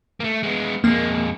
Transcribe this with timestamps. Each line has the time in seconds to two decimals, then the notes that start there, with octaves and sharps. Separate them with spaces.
0.20 A3 A#3
0.43 G#3 B3
0.84 F2 G#3 A#3